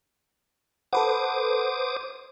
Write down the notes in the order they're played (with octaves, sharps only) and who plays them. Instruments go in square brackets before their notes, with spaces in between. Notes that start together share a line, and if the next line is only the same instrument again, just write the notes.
[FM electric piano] A4 B4 F#5 [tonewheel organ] C5 D6 D#6